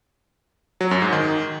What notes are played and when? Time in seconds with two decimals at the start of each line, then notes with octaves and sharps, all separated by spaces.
0.81 F#3
0.91 F#2
1.02 G#2
1.13 D#3